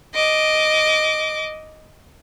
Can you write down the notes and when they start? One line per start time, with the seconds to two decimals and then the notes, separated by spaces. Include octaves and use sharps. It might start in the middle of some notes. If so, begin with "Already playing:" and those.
0.13 D#5 D6